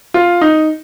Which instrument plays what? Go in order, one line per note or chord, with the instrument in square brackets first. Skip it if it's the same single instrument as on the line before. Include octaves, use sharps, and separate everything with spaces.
[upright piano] F4
D#4